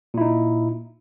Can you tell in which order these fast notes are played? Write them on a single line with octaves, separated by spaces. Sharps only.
A#2 E4 D#4